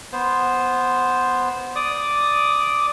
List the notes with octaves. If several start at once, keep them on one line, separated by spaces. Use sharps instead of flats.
B3 C5
D5 D6 D#6